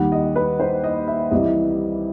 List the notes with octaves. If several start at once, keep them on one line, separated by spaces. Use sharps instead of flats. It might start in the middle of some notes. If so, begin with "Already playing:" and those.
Already playing: D#2 D#3 G3 F#5
D#5
B4
C5
D#5
E5
C2 C3 E3 G3 D#5